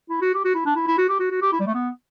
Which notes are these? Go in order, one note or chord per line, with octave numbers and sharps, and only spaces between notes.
E4
F#4
G4
F#4
E4
D4
E4
E4
F#4
G4
F#4
F#4
G4
E4
G3
A3
B3